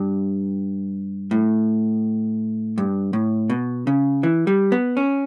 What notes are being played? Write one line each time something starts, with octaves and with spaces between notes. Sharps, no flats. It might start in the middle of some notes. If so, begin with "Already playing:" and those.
Already playing: G2
A2
G2
A2
B2
C#3
E3
G3
B3
C#4